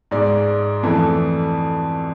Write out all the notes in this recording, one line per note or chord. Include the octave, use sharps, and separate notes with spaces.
G#2 G#3 D5
F2 E3 A3